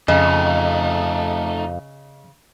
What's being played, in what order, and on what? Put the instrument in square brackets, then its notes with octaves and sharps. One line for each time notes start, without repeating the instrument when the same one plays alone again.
[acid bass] F2 [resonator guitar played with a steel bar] C#3 [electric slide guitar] A3 D#4 [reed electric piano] D#5